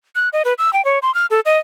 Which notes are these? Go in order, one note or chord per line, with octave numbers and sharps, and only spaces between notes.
F#6
D#5
B4
E6
G5
C#5
C6
F6
A4
D#5